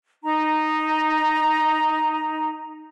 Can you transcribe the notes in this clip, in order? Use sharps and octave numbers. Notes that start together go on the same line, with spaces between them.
D#4 A#5